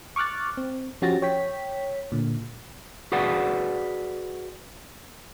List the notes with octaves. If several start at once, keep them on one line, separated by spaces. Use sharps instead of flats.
C#6 D6 F6 F#6 A6
C4
F3 C#4 F#4 G4 A6 A#6
C#5 G5 B6
A#2 D3
F#4 G#4 B4 D5 F#5